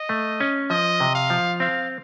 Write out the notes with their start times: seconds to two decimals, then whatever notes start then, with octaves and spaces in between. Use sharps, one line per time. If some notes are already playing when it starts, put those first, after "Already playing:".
Already playing: D#5
0.09 A3
0.40 C#4
0.70 F3 D#5
1.00 C3
1.15 F5
1.30 F3
1.60 C4 F5